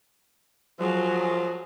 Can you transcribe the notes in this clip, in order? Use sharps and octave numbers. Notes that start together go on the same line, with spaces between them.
F3 F#3 G#4